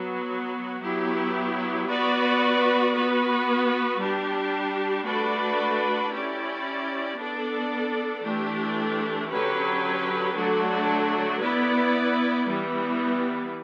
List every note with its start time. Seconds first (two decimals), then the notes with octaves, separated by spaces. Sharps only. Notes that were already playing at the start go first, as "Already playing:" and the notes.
Already playing: F#3 B3 F#4
0.82 F#3 B3 E4 G4
1.88 B3 F#4 B4 D5
2.94 B3 F#4 B4
3.99 G3 D4 G4
5.06 A3 D4 F#4 B4 D5
6.12 C#4 E4 G4 D5
7.17 B3 D4 A4 D5
8.24 E3 A3 D4 G4
9.29 D3 F#3 C#4 G4 B4
10.35 D3 F#3 A3 D4 F#4
11.41 B3 E4 B4 D5
12.47 E3 G3 B3